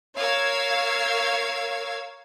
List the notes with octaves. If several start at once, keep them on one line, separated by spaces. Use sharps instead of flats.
A#4 C#5 F5 E6 G#6